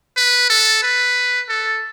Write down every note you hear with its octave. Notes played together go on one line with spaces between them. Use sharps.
B4
A4
B4
A4